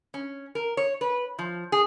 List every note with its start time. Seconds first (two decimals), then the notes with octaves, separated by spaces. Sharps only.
0.14 C#4
0.55 A#4
0.77 C#5
1.01 B4
1.39 F3
1.72 G#4